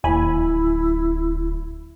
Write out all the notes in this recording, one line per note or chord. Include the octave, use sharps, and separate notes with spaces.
D1 D#2 E4 G#5 B5